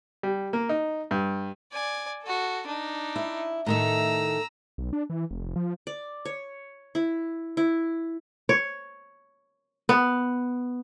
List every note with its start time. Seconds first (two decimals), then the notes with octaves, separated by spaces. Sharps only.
0.23 G3
0.53 A#3
0.69 D#4
1.11 G2
1.73 D5 G#5
2.23 F#4 A4
2.67 D4 D#4
3.16 E4
3.66 A2 D#3 A3 A#5 E6
4.78 B1
4.93 D4
5.10 E3
5.31 F1
5.56 F3
5.87 D5
6.25 C#5
6.95 E4
7.57 E4
8.49 C#5
9.89 B3